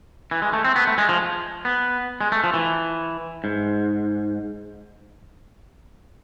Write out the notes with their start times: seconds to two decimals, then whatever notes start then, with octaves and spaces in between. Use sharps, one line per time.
0.31 E3
0.42 G#3
0.53 A3
0.65 C4
0.76 B3
0.87 A3
0.98 G#3
1.09 F3
1.65 B3
2.21 G#3
2.32 A3
2.44 F3
2.54 E3
3.44 G#2